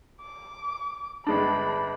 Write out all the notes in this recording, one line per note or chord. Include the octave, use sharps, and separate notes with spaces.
D6
G1 G#3 D4 B5